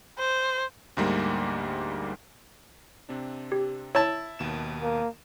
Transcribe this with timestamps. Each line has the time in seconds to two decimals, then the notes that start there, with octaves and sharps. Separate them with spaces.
0.19 C5
0.97 D2 G#2 G3 A#3
3.09 C3 C4 D4
3.52 G4
3.95 E4 C#5 A5
4.39 D#2 B2 E7
4.82 A#3